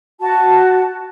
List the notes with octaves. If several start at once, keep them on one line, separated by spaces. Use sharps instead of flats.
F#4 A5